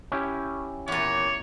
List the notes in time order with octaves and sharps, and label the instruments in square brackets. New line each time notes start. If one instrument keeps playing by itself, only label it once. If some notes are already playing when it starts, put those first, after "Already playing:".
[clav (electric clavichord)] C#4 E4 G4
[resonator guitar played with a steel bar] E2 A#2 [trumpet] C#5